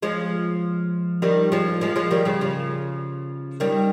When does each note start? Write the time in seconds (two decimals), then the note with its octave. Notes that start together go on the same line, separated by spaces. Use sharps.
0.02 F3 G#3
1.22 D#3 G3
1.52 F3 G#3
1.81 F3 G#3
1.96 F3 G#3
2.11 D#3 G3
2.25 C#3 F3
2.41 C#3 F3
3.60 D#3 G3